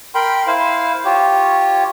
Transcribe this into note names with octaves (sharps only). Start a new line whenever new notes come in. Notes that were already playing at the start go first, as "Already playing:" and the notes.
A#4 G5 B5 C6
E4 C5 F5
F4 G4 C#5